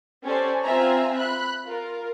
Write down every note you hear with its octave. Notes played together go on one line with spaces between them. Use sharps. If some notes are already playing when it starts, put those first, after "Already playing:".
C#4 G4 A4 C5 D5
C4 F4 E5 G#5 A#5
B5 F#6
F4 A#4